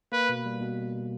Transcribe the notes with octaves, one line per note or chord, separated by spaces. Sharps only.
A#3 B4
B2
G3
B2